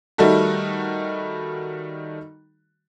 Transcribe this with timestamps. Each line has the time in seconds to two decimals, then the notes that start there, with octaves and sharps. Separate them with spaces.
0.18 D#3 G3 A3 D#4 F#4 A4